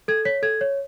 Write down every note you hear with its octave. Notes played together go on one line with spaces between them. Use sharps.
A4 G#6
C#5 B6
A4 G#6
C#5